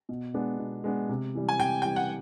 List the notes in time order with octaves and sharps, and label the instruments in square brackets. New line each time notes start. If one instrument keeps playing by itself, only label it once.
[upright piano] B2
G#3 B3 D4
B2
G#3 B3 D4
C3
E3 G3
[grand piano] G#5
[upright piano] C3 [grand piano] G5
[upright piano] E3 G3 [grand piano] G5
[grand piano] F#5